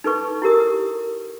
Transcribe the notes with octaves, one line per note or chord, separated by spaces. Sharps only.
D#4 A4 B4 C#6
E4 G4 A#4 D#6